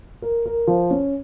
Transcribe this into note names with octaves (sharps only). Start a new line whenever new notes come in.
A#4
A#4
F3
C#4